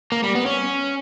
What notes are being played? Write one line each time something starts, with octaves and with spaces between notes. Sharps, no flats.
A#3
G3
B3
C#4